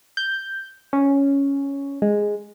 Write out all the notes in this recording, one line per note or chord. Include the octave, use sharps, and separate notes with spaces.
G6
C#4
G#3